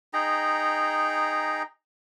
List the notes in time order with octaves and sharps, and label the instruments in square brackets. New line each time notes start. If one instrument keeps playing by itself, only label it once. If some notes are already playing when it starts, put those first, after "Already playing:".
[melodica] D#4 G#4 G5 A#5